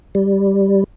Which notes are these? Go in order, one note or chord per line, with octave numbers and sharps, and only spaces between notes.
G3